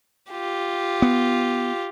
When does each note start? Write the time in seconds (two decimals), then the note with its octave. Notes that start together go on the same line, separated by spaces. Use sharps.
0.31 F4 G4
1.02 B3